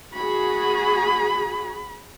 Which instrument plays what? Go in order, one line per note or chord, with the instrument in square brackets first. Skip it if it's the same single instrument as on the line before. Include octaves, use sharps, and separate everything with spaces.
[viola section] F#4 G#4 [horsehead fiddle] B5